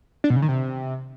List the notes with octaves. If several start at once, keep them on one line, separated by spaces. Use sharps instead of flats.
D4
B2
C#3
D#3
C3